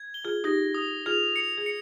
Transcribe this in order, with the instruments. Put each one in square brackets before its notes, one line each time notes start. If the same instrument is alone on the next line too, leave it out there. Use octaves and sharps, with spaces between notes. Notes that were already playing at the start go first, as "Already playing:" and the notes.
Already playing: [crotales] G#6
G7
[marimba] F4 G#4
[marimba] D#4 G4 [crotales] A#6
[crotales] D#6
[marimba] F4 G#4 [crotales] F7
[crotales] C#7
[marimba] G#4
[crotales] C#7